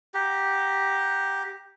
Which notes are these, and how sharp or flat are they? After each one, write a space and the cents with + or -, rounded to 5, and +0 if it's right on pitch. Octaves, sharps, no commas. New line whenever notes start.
G4 +0 F#5 +0 A#5 +15